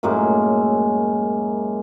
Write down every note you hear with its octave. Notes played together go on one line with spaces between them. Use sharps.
F#2 A2 G#3 A#3